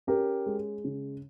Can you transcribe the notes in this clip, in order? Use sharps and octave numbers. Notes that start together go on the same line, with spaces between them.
C#4 G4 A#4
G#3
C#3